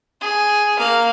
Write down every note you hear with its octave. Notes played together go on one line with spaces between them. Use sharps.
G#4
A#3 F5